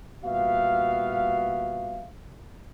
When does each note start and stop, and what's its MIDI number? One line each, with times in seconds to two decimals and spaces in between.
0.24 2.06 46
0.24 2.06 55
0.24 2.06 59
0.24 2.06 66
0.24 2.06 76
0.24 2.06 77